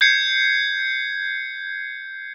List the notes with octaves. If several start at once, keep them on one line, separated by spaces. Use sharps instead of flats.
G6 G#6 C7 C#7